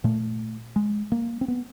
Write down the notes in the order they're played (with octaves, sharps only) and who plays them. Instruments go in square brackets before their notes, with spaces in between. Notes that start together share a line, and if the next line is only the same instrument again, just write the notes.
[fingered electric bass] A#2 A3
G#3
A#3
C4
B3